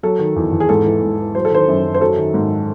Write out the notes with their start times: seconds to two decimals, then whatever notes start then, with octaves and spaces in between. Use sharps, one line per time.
0.03 F#3 A4
0.19 D#3
0.36 E2
0.52 E2
0.60 G#4
0.69 G#2 A4
0.86 E3
1.02 G#2
1.19 E3
1.35 F#3 C5
1.45 A4
1.51 D#3 C5
1.68 F#2
1.84 F#2
1.94 C5
2.01 F#3 A4
2.17 D#3
2.34 G#2